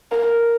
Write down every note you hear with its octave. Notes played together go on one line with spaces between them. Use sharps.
A#4